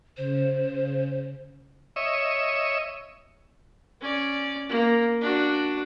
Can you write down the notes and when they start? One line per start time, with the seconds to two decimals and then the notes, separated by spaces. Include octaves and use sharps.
0.17 C#3 C5
1.96 C#5 D#5 E5
4.01 C#4 D5
4.69 A#3
5.21 D4 F#4